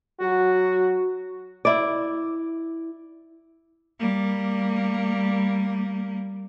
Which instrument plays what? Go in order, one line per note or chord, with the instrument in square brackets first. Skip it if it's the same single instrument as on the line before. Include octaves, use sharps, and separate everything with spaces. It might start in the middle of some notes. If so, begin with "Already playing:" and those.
[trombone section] F#3 F#4
[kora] E4 D5
[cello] G3 A#3